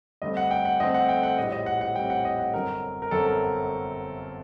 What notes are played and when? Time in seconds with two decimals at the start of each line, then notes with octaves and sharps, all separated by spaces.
0.22 G2 D3 A3 C4 D#5
0.37 F#5
0.51 G5
0.65 F#5
0.80 G2 D3 A3 C4 D#5
0.95 F#5
1.09 G5
1.23 F#5
1.38 A#1 A2 G3 C4 D#5
1.52 D#5
1.66 F#5
1.81 F#5
1.95 A#1 A2 G3 C4 G5
2.10 F#5
2.25 D#5
2.39 F#5
2.54 G1 F#2 D3 F#3 C4 A#4
3.02 A#4
3.11 G1 F#2 D3 F#3 C4 A4
3.26 A#4